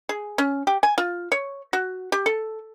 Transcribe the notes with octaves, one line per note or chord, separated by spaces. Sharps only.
G#4
C#4
G4
G#5
F4
C#5
F#4
G4
A4